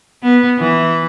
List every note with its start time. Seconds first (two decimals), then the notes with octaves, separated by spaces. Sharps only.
0.23 B3
0.59 E3